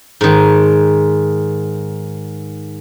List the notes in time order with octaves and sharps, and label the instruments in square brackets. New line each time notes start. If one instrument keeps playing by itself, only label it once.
[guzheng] G#2 D#3